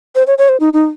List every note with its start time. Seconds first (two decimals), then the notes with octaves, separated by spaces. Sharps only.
0.15 C5
0.27 C#5
0.38 C#5
0.49 C5
0.60 D#4
0.73 D#4